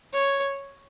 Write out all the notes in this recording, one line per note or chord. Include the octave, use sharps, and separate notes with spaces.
C#5